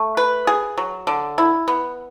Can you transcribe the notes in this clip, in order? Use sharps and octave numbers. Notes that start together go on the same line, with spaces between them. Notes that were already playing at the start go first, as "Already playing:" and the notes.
Already playing: A3
B4
G#4
F#3
D3
E4
B3